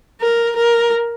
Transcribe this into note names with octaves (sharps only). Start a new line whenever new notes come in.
A#4
A#4